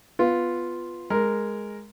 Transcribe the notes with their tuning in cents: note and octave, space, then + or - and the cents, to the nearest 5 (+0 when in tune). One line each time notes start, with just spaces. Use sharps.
B3 +5 F4 +0
G#3 +0 A#4 +0